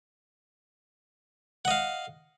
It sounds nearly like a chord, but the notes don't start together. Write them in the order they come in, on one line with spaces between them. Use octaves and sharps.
F#5 D#5 F5